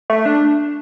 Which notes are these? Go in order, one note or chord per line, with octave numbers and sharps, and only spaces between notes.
A3
D4